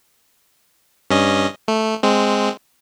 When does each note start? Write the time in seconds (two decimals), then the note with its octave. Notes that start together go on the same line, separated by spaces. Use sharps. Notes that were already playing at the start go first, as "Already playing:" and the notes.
1.10 G2 C#4 D#5
1.68 A3
2.03 G#3 C4